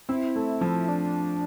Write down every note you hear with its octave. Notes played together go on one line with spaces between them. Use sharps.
C4 E4
A3
F3
D4